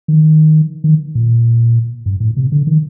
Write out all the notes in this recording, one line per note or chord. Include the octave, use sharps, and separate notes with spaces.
D#3
D#3
A#2
G2
A2
C3
D3
D#3